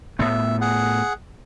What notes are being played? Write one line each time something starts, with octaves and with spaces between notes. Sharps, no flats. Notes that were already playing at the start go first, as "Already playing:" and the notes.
A2 B3 E5
G#4 F#5